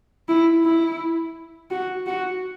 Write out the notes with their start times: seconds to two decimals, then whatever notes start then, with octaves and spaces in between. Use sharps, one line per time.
0.29 E4
0.64 E4
1.71 F#4
2.06 F#4